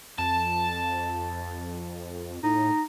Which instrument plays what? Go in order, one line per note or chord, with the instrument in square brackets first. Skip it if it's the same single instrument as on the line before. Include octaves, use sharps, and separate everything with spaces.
[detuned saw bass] F2 [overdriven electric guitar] A5
[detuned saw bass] A2 [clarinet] D#4